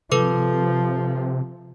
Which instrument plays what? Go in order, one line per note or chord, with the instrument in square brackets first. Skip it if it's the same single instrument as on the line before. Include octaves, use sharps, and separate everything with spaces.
[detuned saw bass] C3 [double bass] F3 [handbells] A4 B4 D6